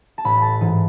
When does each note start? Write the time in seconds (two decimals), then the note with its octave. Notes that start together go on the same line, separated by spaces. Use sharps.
0.18 A5
0.25 A1 B5
0.42 A5
0.61 G#2 E3